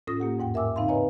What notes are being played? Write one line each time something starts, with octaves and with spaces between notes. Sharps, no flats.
A2 C#4 F4 A4 D#6 A#6
A#3 G4 F#5
E2 G#2 F#5 G5
A#4 E5 G#5 D6 E6
C#3 C4 D#4 F5 B5 C6
B4 C#5 D#5 G#5 A#5